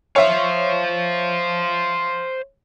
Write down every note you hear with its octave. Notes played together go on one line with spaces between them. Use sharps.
C5 C#5 E5 F5